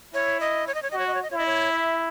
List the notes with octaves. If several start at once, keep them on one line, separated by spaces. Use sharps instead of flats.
E4 C#5
D#5
C#5
D#5
C#5
F#4 D#5
C#5
D#5
C#5
D#5
E4 C#5
D#5
C#5
E5